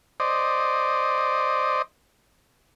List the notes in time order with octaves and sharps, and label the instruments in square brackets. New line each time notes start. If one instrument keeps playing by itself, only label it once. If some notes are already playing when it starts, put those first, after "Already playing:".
[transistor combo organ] C5 D5 D#5